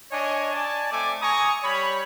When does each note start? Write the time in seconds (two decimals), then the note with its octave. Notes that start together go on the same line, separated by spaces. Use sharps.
0.12 D4 C#5 D#5 G#5
0.54 D5 G#5 A5
0.92 A3 C4 G#5 D6
1.22 G#5 A#5 C#6 D#6
1.63 G3 C#5 B5